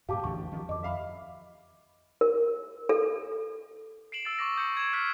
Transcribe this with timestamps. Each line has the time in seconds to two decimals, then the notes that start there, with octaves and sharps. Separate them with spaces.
0.09 G2 A#2 G4 F5 A5 D6
0.24 A1 E2 D3 C#6
0.52 D#3 F3 C#4
0.69 F2 D#5 D6
0.83 E5 F5 B5
2.21 A#4
2.89 A4
4.12 C7 D7 E7 F#7
4.25 E6 A6
4.39 C#6 D6 A#6
4.56 D#6 G6 C#7
4.77 G#6 E7
4.93 C#6 F6 F#6 G#6 B6